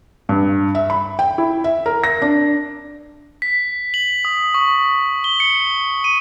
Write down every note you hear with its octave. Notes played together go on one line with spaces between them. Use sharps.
G2
E5
B5
G5
E4
E5
A#4
A#6
D4
B6
F#7
D#6
C#6
G7
C#7
D#7